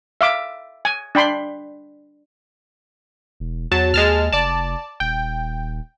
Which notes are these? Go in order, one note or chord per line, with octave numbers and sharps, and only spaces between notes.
E5 F5 D6
G#5
D4 G5 B5 C6
E1
E2 F#3 A5
D#2 G#3 A5 F6
F1 D5 A5
D#1 G5